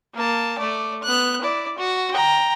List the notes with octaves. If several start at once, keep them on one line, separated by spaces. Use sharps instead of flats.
A#3 A5
A3 D5
B3 F#6
E4 D5
F#4
G5 A#5